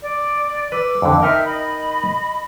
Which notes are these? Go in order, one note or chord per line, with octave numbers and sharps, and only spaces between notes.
D5
B4 D6 E6
F2 D3
D#4 A#4 E5 G5 F6
D#5 B5